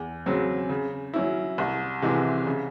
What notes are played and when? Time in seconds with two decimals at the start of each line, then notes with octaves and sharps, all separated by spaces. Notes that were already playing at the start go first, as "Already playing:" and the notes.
Already playing: E2
0.26 C#3 F#3 C4
0.69 C#3
1.14 F#3 C#4 E4
1.58 C2
2.02 C3 E3 G#3
2.46 C#3